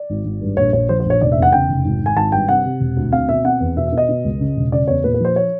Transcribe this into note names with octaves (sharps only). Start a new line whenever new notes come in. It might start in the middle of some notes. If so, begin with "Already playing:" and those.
Already playing: D5
G#1
G#1
G2
A#1 C#5
A#1 C#5
F3 C5
C5
A#1 C#5
F1 D5
E5
E2
F#5
C#3 G5
F1
G#1
G#1 G#5
G#1 A5
G2 G5
C3 F#5
C3
E1
D2
C4 F5
B2 E5
C4 F#5
E2
B2 E5
E5
B2
D#5
B2
C#2
C#3
E1
C#3 D5
E2 C#5
A#2 B4
B4
F3 C5
C#5